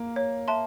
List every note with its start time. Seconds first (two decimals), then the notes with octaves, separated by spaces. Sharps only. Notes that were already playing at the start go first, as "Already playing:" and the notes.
Already playing: A#3
0.16 C#5
0.48 E5 A5 C6